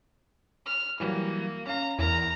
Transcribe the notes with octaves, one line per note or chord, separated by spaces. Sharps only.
F6
E3 F#3 G3 A#3
C#4 F5 A#5
E2 E4 A#4 A#5